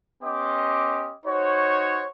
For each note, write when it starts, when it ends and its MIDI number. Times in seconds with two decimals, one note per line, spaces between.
0.23 1.12 59
0.23 1.12 61
0.23 1.12 67
0.23 1.12 75
0.23 1.12 84
0.23 1.12 86
1.26 2.04 63
1.26 2.04 66
1.26 2.04 72
1.26 2.04 73